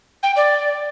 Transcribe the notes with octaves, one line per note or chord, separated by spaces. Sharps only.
G5
D5